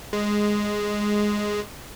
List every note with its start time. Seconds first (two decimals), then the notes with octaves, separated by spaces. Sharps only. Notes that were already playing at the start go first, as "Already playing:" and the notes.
0.13 G#3